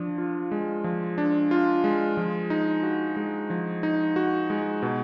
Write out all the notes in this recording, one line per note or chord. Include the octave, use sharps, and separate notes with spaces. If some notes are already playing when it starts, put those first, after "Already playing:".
Already playing: F3 D4
F4
G#3
F3
D4
F4
G#3
F3
D#4
F#4
G#3
F3
D#4
F#4
G#3
B2